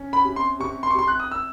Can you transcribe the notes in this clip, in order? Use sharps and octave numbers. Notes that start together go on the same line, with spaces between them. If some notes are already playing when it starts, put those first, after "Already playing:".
Already playing: C#4
B5
C3
C6
C3 C#6
C6
C#6
C3 C6
F#6
D#6
E6